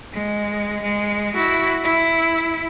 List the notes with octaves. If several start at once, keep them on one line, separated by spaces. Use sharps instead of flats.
G#3
G#3
E4 F#4
E4